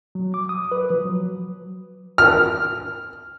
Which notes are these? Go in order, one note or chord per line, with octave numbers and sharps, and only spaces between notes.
F#3
D6
D#6
B4
F3
F#3
F6